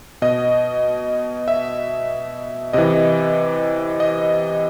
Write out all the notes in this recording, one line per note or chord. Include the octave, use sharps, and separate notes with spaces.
B2 D#5
E5
C3 E3 D#5
D#5